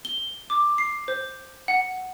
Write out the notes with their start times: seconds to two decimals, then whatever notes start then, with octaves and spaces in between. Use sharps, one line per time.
0.05 G7
0.50 D6
0.78 C7
1.08 C5
1.68 F#5